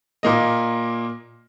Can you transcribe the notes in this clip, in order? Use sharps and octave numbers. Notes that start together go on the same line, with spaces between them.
A#2 A#3 D#5